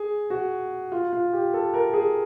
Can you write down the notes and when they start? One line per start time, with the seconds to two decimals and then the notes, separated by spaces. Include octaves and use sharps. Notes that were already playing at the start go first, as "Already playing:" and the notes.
Already playing: G#4
0.30 F#4
0.92 F4
1.13 F4
1.33 G4
1.54 A4
1.74 A#4
1.93 G#4